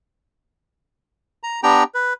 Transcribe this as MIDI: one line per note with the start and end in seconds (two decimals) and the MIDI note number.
1.43 1.60 82
1.63 1.83 59
1.63 1.83 62
1.63 1.83 67
1.63 1.83 79
1.63 1.83 82
1.95 2.13 71